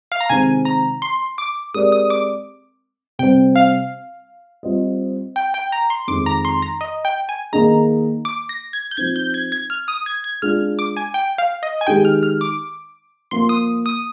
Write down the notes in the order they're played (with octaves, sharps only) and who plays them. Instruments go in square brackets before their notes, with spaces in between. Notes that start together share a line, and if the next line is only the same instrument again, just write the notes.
[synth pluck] F5
A#5
[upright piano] C3 D#3 G#3 C4 [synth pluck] G#5
[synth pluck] A#5
C6
D6
[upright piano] G#3 C4 G4 A#4 D5 [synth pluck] D#6
[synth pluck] D#6
D6
[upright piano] C3 G3 C4 [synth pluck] G5
[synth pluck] F5
[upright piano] G3 C4 F4 C5 D#5
[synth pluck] G5
G5
A#5
C6
[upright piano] F2 D#3 G#3 [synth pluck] D6
[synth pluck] A#5
C6
A#5
D#5
G5
G#5
[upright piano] D#3 A#3 D#4 G#4 D#5 [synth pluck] A#5
[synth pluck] D6
A#6
G#6
G6
[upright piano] F3 C4 D#4 [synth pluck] G#6
[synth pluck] G6
G#6
G#6
F6
D#6
G#6
G#6
[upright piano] G#3 D4 F4 [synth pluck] F6
[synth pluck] D6
G#5
G5
F5
D#5
G#5
[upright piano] D#3 G#3 D#4 G4 [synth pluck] G5
[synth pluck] F6
F6
D6
[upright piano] F3 A#3 F4 [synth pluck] C6
[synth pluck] D#6
D#6